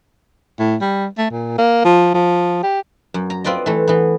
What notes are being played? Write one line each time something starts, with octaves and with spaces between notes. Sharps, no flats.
A2
G3
A3
A#2
A#3
F3
F3
G4
F#2
A#5
C4 F4 B4 D5 D#5
E3 A3
E3 B3